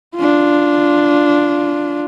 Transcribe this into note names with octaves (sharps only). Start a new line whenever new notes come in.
D4 F4